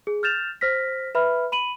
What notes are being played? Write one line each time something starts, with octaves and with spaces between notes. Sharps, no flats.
G#4
F6 G6 A6 E7 F7
C5 F6 A#6 B6
B4 E5 B5 F6
B5 D#7 F#7